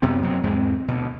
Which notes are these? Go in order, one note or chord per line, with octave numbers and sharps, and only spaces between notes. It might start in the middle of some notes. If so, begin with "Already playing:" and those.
F#2 C3 B3 C4
A#2 F#3 C4
E2 G#2 G#3 C4
D2 B2